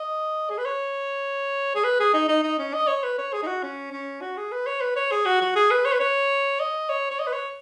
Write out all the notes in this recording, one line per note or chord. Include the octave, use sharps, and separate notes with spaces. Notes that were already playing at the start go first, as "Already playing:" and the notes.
Already playing: D#5
G#4
B4
C#5
G#4
B4
G#4
D#4
D#4
D#4
C#4
D#5
C#5
B4
C#5
G#4
D#4
F#4
C#4
C#4
F#4
G#4
B4
C#5
B4
C#5
G#4
F#4
F#4
G#4
B4
C#5
B4
C#5
D#5
C#5
C#5
D#5
B4
C#5